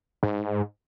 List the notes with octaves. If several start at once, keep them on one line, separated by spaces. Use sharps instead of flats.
G#2